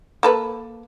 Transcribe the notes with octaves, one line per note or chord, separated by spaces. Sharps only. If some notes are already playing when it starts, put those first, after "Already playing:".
A#3 A4 B4